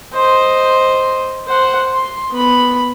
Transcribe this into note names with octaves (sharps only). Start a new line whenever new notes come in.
C5 D#5
C5 F#5
C6
B3 B5